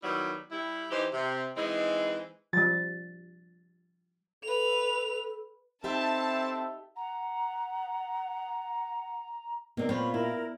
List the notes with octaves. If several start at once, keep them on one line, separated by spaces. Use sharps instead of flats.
D#3 F#3 G3 B3 E4
G3 E4
E3 D#4 G4 C5
C3
E3 G#3 C4 D#4 E4
F3 G3 A6
A4 B4 F7
C4 D#4 E4 G4 A4 E5 A5
F#5 A#5
C3 A#3 B3 D#4 D5 G5
A#2 C4 F4 C#5 B5
E4 A#4